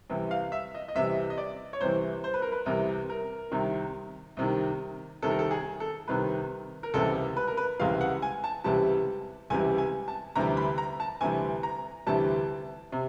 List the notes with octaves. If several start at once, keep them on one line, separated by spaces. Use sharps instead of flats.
C2 C3 E3
F5
E5
D#5
D#5
C2 C3 E3 E5
D#5
D5
C#5
C2 C3 E3 C5
C5
B4
A#4
B4
C2 C3 E3 A#4
A#4
C2 C3 D#3
C2 C3 D#3
C2 C3 D#3 A4
A#4
A4
G#4
A4
C2 C3 D#3 B4
A#4
C#2 C3 E3 G3 A4
B4
A#4
B4
C#2 C3 E3 G3 F5
F#5
G#5
A5
C#2 C3 E3 G3 A5
C#2 C3 E3 G3 G#5
G#5
A5
D2 C3 E3 G3 A#5
B5
A#5
A5
D2 C3 E3 G3 G#5
A#5
D2 C3 E3 G3 A5
C3